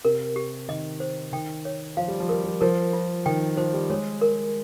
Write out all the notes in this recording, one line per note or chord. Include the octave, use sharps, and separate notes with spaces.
C3 A#4
G4
D#3 D#5
C5
D#3 G5
C#5
F3 F5
G3
F3
G3 A#4
F3
F3 A#4
F4
D#3 G5
F3 C5
G3
G#3 C#5
A#4